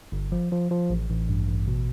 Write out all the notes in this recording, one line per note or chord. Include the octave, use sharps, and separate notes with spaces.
G1
F3
F3
F3
A1
A1
G2
A1
B2